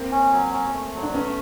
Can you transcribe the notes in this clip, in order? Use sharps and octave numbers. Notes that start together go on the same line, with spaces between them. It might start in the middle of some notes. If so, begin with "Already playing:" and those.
Already playing: A#3 C4
C#4
F#3
C#4
A3
F#3
D4
A3 B3 C#4